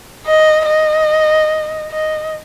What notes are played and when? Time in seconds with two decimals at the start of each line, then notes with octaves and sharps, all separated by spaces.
0.26 D#5
0.67 D#5
1.91 D#5